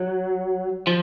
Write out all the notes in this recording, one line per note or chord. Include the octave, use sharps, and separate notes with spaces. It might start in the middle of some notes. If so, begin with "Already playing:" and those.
Already playing: F#3
F3